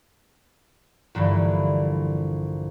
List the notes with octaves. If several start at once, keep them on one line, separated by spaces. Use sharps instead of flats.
A#1 G2 D3 E3